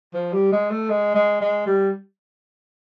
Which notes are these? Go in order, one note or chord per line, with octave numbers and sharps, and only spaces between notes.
F3
G3
G#3
A3
G#3
G#3
G#3
G3